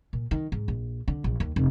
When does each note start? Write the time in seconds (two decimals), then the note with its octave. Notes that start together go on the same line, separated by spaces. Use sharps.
0.13 A#2
0.31 D#3
0.52 G#2
0.68 A#1
1.08 D3
1.24 A#1
1.40 D#2
1.56 F1